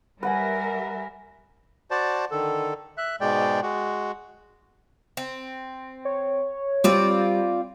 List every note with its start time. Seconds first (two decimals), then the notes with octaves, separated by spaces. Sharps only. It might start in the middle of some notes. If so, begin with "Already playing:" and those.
0.23 G3 A#4 B4 E5 F#5 G#5
1.91 F#4 C5 D5 A5
2.31 D3 D#3 A4
2.98 E5 F#6
3.21 G#2 B2 G#3 D5 G5
3.63 G#3 F#4
5.17 C4
6.05 C#5
6.84 G3 C4 F4 D5